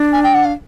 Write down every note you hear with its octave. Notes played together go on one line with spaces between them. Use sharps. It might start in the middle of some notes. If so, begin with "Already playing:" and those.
Already playing: D4
G#5
G5
F#5
F5